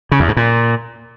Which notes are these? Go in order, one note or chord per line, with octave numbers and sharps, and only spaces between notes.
C#3
E2
G#2
A#2